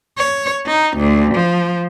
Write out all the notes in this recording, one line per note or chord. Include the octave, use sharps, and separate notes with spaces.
C#5
D#4
D2
F3